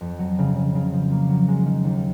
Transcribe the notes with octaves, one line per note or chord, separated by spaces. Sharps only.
F2
F#3
C#3
C#3
C#3
F3
A#3
F#3
G#3
D#3
D#2